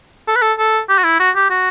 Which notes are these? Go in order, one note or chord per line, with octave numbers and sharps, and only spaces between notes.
A4
B4
A4
A4
G4
F#4
E4
F#4
G4
F#4